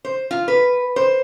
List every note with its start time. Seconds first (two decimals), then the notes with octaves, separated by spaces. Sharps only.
0.05 C5
0.31 F4
0.48 B4
0.96 C5